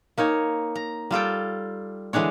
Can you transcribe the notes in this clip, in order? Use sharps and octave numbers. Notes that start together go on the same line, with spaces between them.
A#3 D#4 C#5 G#5
A#5
G3 F4 A4 G5
D3 E3 G#3 D4 C#5